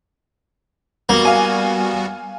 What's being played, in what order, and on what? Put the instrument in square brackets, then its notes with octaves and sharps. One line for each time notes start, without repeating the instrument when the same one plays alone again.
[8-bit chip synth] G3 B3 F#4 [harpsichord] A#3
[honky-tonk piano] F5 G#5